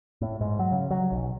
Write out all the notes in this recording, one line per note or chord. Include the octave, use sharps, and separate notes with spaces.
A2
G#2
F#3
C#3
F#3
B1